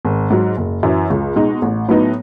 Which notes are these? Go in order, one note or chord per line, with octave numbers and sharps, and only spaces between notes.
G#1
G#2 F#3
F#1
F#2 E3
C#2
B2 G#3 D#4
A1
A2 F#3 B3 D#4